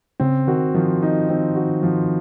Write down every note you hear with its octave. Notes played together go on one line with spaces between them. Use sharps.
C#3 C4
D#3 F#4
D#3 F3
D#4
C4
F#4
F3